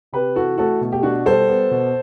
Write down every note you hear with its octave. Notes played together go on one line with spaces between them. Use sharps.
C3 G4 B4
E3 F#4 A4
A3 F#4 A4
B2
G4
B2 D4 F#4
G3 A4 C5
B3
B2